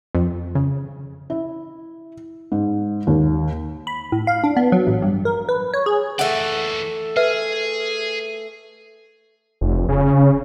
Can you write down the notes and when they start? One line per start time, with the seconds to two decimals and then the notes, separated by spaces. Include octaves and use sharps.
0.15 F2
0.55 C#3
1.30 E4
2.52 G#2
3.07 D#2
3.87 B5
4.12 A2
4.27 F5
4.44 D4
4.57 B3
4.72 F#3
4.87 A1
5.02 G2
5.25 A#4
5.49 B4
5.74 C#5
5.86 G#4
6.19 E3 A3 D5 F#5
7.17 G#4 B4 E5 F6
9.61 F1
9.89 C#3